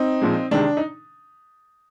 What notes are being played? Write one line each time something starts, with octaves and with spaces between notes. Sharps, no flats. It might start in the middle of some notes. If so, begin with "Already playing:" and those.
Already playing: C4 D#4
A#2 F3 G#3
C3 D#3 G#3 D4
D#4